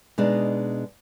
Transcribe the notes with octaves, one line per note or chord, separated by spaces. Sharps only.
B2 G#3 D4 D#4